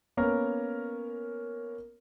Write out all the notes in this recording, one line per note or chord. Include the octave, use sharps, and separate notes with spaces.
A#3 B3 C#4 A#4